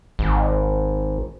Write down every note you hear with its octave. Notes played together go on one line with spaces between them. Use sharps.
G#1